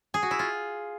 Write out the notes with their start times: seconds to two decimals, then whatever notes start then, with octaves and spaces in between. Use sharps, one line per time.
0.14 G#4
0.22 F#4
0.31 E4
0.39 F4